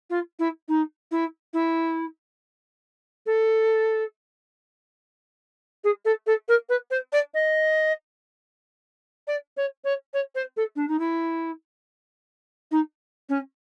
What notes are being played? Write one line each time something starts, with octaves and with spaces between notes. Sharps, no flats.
F4
E4
D#4
E4
E4
A4
G#4
A4
A4
A#4
B4
C5
D5
D#5
D5
C#5
C#5
C#5
C5
A4
D4
D#4
E4
D#4
C#4